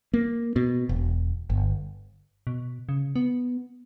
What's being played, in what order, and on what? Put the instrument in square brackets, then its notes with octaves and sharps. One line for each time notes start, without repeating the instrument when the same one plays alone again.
[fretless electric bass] A#3
B2
E1
G1
[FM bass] B2
C#3
B3